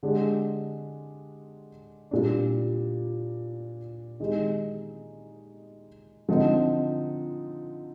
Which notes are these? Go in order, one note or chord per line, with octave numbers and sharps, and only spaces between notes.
D3 G#3 D4 G4
A#2 G3 D4
D#3 G#3 D#4 G4
D3 F3 C4 D#4